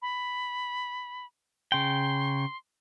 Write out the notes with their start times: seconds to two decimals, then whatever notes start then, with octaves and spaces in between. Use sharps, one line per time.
0.02 B5
1.72 C#3 G5 C6